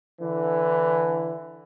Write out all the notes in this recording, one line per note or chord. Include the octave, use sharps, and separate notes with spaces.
D3 E3